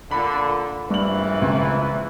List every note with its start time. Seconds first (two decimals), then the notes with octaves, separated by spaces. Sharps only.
0.11 A#2 D3 B5
0.90 A#1 G2 E3 B4 F#7
1.42 C#2